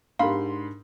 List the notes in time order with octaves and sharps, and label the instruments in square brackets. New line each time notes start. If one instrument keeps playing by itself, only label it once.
[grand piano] G#2 B5 C6 [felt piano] D4 G4 A#4 [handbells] F5